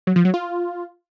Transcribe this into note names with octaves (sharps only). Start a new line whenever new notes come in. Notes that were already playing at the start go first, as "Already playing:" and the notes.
F#3
F3
F#3
F4